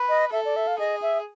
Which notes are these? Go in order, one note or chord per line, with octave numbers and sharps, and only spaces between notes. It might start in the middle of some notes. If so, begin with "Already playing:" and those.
Already playing: B4
D#5
A4 E5
D5
E5
F5
G#4 D#5
E5